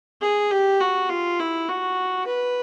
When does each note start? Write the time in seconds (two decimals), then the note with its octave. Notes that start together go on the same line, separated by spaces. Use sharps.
0.21 G#4
0.51 G4
0.81 F#4
1.09 F4
1.39 E4
1.68 F#4
2.27 B4